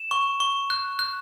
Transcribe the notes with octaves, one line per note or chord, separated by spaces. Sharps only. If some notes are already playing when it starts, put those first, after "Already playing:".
Already playing: E7
C#6
C#6
F#6
F#6